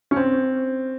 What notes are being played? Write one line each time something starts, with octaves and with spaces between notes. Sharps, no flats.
C#4
C4